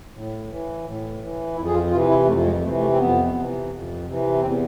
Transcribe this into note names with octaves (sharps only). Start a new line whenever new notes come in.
A2
E3
A2
E3
F2 E4
G#4
F4
C3 E3 F4
E4
F2 A3
G#3
C3 E3 A3
A3
C4
F2 B3
C3 E3
F2
C3 E3
E2 C4